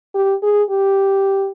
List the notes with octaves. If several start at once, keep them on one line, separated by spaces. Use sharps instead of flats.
G4
G#4
G4